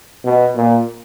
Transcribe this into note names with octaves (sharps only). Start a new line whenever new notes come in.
B2
A#2